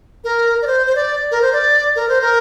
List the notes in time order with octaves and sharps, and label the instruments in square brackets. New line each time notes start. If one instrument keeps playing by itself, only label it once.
[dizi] A#4
D5
C5
C5
D5
A#4
C5
D5
A#4
C5
A#4